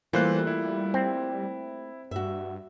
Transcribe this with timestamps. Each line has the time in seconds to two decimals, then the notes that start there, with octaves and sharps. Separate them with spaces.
0.13 E3 G3 A3 A#3 F4 C5 F#6
0.47 E4
0.94 C4
2.11 G2 F#4 E5